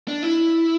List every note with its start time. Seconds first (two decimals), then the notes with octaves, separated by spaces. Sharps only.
0.08 D4
0.23 E4